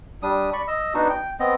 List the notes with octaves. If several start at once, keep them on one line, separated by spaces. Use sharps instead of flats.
G3 D4 D#6
D5 B5 C#6
D#5 E6
B3 D4 D#4 F#4
G5
B3 C4 D#5